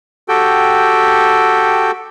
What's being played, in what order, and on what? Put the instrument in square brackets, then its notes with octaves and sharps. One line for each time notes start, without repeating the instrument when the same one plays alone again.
[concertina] F#4 G4 A4 G5